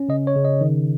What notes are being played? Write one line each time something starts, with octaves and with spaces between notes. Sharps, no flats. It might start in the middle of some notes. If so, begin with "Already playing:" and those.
Already playing: C#4
C#3 D#5
C#5
C#3
D#5
D#3